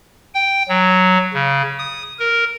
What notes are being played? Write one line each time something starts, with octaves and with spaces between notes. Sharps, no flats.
G5
F#3
C#3
D#6
A#4